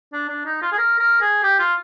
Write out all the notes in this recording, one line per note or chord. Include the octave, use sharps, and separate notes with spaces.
D4
D4
D#4
F4
G#4
A#4
A#4
G#4
G4
F4